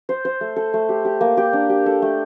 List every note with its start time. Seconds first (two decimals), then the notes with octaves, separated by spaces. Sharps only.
0.09 C5
0.25 C5
0.41 A3
0.56 A4
0.74 A3
0.89 G4
1.05 G4
1.21 A#3
1.37 G4
1.53 D4
1.70 G4
1.86 A4
2.02 A3